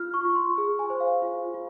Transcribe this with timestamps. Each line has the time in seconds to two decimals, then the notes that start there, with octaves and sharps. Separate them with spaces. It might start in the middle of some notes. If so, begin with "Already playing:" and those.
Already playing: F4 F6
0.14 C#6
0.25 F4
0.35 C6
0.58 G#4
0.79 G#5
0.90 C5
1.00 F5
1.22 F4
1.54 F4